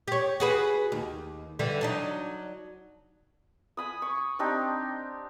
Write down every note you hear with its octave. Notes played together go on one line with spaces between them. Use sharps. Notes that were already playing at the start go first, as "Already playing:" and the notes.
G4 C#5
F#4 G#4 B4
D#2
D3 E3 G3
F#3 D4 D#4
G#5 B5 D#6
C#6
C4 D4 D#4 G4